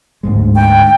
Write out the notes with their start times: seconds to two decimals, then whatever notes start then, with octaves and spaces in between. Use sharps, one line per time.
0.23 D2 G#2 G#3
0.55 G5